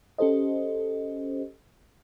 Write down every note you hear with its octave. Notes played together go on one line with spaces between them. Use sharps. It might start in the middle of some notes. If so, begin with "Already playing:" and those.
C#4 G4 A4 C5 D#5